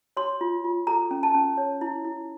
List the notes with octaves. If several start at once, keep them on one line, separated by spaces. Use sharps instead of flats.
C#5 C6
F4
F4
A4 A#5
C#4
A5
C#4
C#5
E4
E4